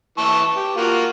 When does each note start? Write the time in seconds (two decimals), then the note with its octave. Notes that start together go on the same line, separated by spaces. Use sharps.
0.18 E3 A5 C#6
0.56 G4
0.77 A#3 F4 F#4